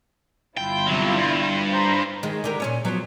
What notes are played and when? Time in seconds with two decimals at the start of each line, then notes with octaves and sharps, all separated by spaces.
0.57 G1 E4 F4 G5
0.87 C3 F#3
1.17 G2
1.71 C5 A#5 B5
2.23 D#3 G#3
2.44 D3 G4 A#4
2.60 A#2 C#4 C#5
2.85 F3 F#3 B3